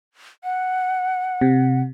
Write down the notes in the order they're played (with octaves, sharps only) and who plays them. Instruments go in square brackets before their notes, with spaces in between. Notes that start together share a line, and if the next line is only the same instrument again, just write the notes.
[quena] F#5
[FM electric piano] C3